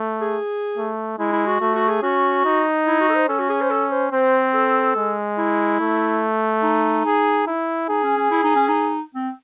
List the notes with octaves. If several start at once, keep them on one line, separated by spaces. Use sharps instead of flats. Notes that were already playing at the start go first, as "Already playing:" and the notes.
Already playing: A3
G#4
A3
G#3 E4
E4
F#4
A3 F#4
F#4
G#4
C#4 F#4
D#4
E4
F#4
A4
C5
C#4 A4
F#4
G#4
C5
A4
C5
C4 C5
A4
G#3
E4
A3
D#4
G#4
E4
D#4 G#4
C#4
C#4
E4
D#4
C#4
D#4
C4